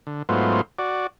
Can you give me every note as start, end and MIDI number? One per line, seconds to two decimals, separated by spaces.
0.07 0.22 50
0.29 0.61 44
0.29 0.61 54
0.29 0.61 57
0.29 0.61 59
0.29 0.61 65
0.29 0.61 72
0.79 1.07 66
0.79 1.07 74